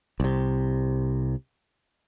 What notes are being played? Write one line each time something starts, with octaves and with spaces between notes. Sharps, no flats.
C2 C3